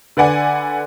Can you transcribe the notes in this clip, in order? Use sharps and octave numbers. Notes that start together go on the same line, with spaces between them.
D3 B4 D5 F#5 G#5